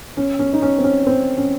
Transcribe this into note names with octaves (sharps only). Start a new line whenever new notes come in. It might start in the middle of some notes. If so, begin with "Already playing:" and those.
C#4
C#4
D#4
C#4
C4
C#4
C4
C#4